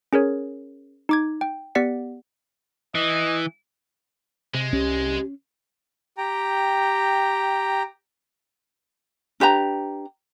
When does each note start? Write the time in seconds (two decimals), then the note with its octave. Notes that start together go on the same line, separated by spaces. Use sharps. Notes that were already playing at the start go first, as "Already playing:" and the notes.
0.13 C#4 G#4 A#4 C#5
1.09 D#4 D6 G#6
1.41 G5
1.75 B3 G4 D5 F#5 B6 C#7
2.95 E3 D#5
4.54 C3 G#3
4.73 C2 C#4 G4
6.18 G4 G5 A#5
9.40 D4 G4 B4 A#5